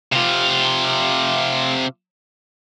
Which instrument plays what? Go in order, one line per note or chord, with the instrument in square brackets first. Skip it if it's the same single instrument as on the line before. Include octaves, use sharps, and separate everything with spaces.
[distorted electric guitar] C3 F4